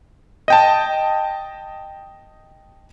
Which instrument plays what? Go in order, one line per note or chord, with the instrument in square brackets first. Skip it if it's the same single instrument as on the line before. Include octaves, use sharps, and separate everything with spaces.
[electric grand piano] D#5 G5 A5